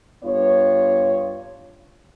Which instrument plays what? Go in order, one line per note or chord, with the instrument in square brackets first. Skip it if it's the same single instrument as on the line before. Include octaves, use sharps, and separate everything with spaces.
[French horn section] G2 B3 F4 C#5